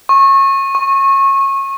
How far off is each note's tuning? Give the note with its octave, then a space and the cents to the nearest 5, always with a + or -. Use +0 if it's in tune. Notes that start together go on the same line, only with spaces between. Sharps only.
C#6 -25
C#6 -15